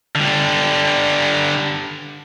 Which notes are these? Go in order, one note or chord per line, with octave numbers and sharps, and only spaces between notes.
D3 G3